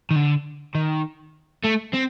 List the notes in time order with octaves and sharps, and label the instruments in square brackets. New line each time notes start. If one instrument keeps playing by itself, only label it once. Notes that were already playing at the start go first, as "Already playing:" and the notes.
[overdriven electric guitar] D#3
D3
D#3
A3
C4